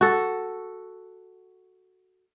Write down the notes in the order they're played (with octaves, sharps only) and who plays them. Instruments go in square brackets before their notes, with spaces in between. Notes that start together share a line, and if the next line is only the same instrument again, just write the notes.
[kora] F#4 A4